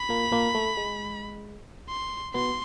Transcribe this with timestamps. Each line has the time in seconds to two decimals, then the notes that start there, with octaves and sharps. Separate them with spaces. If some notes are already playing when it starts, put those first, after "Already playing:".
Already playing: B5
0.09 A#2 A#3
0.32 A#2 A#3
0.55 A3
0.77 G#3
1.89 C6
2.34 B2 B3 C6